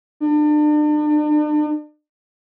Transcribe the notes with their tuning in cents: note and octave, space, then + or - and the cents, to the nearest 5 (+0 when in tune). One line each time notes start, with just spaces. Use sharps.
D4 +40